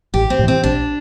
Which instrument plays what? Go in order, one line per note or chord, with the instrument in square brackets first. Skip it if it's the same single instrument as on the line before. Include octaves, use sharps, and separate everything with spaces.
[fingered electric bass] A1 [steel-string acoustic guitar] G4
[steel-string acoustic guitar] C4
[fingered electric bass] A2 E3
[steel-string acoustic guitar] C4
[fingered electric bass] A#1 [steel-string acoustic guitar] D4